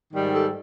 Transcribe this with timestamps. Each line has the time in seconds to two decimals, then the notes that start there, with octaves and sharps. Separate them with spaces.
0.13 G#2 D#3 G3
0.33 G4 A4